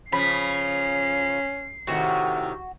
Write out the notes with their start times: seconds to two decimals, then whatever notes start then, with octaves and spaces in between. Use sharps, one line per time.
0.12 C#3 F3 C#4 B5 C7
1.87 A2 C3 D#3 F#4